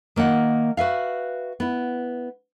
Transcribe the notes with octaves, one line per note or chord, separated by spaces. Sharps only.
D#3 A#3 D#5 F#5
F#4 B4 E5 F5
B3 E4